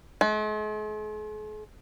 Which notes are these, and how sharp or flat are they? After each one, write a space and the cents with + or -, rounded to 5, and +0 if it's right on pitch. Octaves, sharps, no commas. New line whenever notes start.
G#3 +45